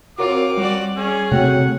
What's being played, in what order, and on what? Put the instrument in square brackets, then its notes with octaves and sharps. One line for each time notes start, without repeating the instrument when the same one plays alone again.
[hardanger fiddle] C4 F4 [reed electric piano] F#4 A#4 C#5 [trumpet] D6
[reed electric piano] G3 [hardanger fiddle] F#4 D5
[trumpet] C#4 [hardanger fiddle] G#4
[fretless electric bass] C3 A3 [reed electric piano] F#4 C#5 G5 [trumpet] F#5